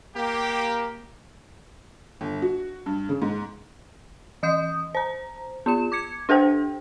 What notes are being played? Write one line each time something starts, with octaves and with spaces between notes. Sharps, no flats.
A#3 G4
G1
F#4
G2
C#3
G#2
E3 D#5 D#6 G6
C5 A#5
B3 F4 E7
D6 G#6 C#7
D4 G4 A4 C5 G5